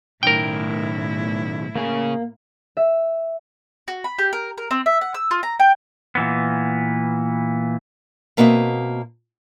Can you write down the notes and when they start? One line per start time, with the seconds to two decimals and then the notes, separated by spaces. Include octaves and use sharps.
0.23 B1 A2 D#3 E4 A#4 G5
1.76 C#3 A#3 G#4
2.77 E5
3.88 F#4
4.04 B5
4.19 G4
4.33 A#4
4.58 A#4
4.71 C4
4.86 E5
5.01 F#5
5.14 E6
5.31 F4
5.43 A#5
5.60 G5
6.15 A#2 E3 B3
8.37 B2 A#3 C4 F#4 D#5 E5